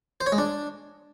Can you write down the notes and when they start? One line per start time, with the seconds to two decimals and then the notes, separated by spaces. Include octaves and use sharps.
0.21 C5
0.26 C#5
0.32 G#3
0.38 D4